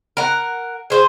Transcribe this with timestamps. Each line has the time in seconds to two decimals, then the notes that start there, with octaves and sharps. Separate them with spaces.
0.17 A#4 F#5
0.90 G#4 C5